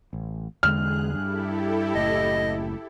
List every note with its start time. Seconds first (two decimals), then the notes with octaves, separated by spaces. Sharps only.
0.13 A1
0.63 E2 D3 G#3 G#4 F6 F#6
1.14 G2 E4 G4 A4
1.95 F#1 A2 D#5